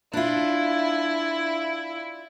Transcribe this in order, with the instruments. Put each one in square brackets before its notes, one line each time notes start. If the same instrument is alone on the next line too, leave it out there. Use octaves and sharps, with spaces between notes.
[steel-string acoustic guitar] D4 F4 [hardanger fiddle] E4